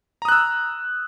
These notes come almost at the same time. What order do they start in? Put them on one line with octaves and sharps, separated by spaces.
A#5 D#6 F#6 E6